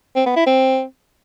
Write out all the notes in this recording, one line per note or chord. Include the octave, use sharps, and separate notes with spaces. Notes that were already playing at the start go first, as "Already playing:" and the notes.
C4
B3
E4
C4